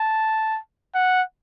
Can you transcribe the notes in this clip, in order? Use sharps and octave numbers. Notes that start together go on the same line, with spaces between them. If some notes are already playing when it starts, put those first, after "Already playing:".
Already playing: A5
F#5